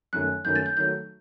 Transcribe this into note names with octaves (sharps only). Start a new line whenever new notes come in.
F#2 D#3 A3 F#6
F#2 D#3 A3 G6
A6
G6
D#3 F#3 A3 G6